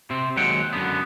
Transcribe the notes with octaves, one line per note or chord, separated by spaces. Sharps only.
C3 C4
D#2 F#3 G#3 C4 F#5 G5
F#2 D3 B3